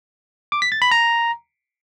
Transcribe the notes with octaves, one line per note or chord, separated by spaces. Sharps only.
D6
B6
A6
B5
A#5